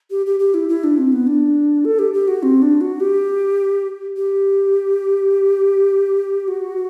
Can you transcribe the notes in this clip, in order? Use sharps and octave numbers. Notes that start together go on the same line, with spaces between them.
G4
G4
G4
E4
E4
D4
C4
B3
D4
A4
G4
G4
F#4
C4
D4
F#4
G4
G4
F#4